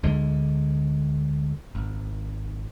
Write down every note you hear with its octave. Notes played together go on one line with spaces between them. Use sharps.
D2 D3 G#3
G#1